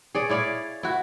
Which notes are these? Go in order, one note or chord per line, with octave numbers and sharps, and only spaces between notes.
G#4 C#5 D5
E4 C#5 D5 F5
E4 F#4